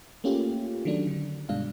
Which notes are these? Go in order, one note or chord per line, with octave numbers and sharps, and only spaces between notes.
A3 A#3 C#4 F4 G4
D#3 F#3 A3 D4
D3
G2 B2 G#3 D4 F5